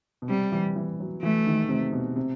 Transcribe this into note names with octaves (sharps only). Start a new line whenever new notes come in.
B2
C3 G3
E3
E3
F#3
E3 A3
D#3
C3
B2
C3